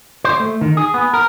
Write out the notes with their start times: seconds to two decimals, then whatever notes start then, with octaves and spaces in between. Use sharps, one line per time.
0.25 C5
0.40 A3
0.61 D#3
0.77 G#4
0.94 B3
1.13 A#4